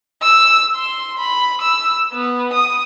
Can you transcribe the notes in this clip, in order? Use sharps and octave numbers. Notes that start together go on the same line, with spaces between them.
E6
C6
B5
E6
B3
D#6